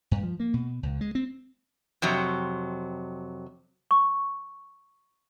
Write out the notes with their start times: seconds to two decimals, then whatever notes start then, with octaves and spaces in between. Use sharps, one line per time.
0.11 G2
0.23 F3
0.40 A#3
0.54 B2
0.83 C#2
1.01 G#3
1.15 C4
2.02 F2 C3 F#3
3.91 C#6